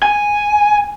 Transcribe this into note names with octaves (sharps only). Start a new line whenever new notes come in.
G#5